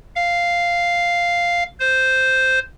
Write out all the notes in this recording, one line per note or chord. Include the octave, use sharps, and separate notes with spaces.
F5
C5